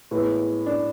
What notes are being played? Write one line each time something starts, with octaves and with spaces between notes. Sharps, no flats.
A2 G#3 B3
D4